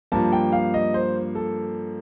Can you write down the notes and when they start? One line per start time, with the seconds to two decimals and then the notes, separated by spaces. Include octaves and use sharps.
0.12 G2 F3 A#3 A5
0.32 G5
0.52 F5
0.74 D#5
0.94 C5
1.35 A4